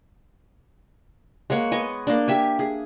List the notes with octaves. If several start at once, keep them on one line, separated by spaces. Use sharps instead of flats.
G#3 A#3 C#5 F#5
B3 D#5 G#5
A#3 D4
G4 E5 G#5
G#4